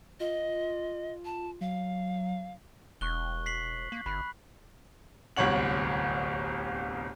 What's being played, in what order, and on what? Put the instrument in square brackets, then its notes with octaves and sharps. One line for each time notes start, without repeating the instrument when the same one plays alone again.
[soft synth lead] F4 [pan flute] D#5
[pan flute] A5
[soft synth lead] F#3 [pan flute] F5
[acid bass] E1 [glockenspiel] C#6 F#6 G7
[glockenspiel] B6 C7 F#7
[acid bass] A#3
[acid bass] G1 [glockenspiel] B5 F#6
[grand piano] D1 G1 C2 C#5 F#5 F#7